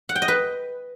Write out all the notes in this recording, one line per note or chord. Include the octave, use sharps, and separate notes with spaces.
F#5
G5
D#5
B4